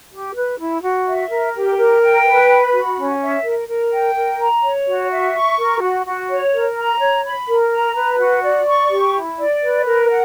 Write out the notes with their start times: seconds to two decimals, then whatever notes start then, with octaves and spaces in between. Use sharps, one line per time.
0.11 G4
0.35 B4
0.58 E4
0.82 F#4
1.06 E5
1.29 A#4
1.54 G4
1.77 A#4
2.01 G5
2.24 B4
2.49 B5
2.72 F#4
2.97 C#4
3.20 E5
3.43 A#4
3.68 A#4
3.91 G5
4.15 A#4
4.39 A#5
4.62 C#5
4.86 F#4
5.11 E5
5.34 C#6
5.58 A#4
5.81 F#4
6.05 F#4
6.29 C#5
6.53 A#4
6.77 A#5
7.00 C#5
7.24 B5
7.48 A#4
7.71 A#5
7.95 B4
8.19 F#4
8.43 D5
8.66 C#6
8.90 G4
9.14 E4
9.38 D5
9.62 B4
9.86 A#4
10.09 F#5